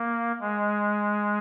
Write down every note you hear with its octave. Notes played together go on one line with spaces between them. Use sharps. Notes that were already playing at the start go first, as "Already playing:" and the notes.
Already playing: A#3
G#3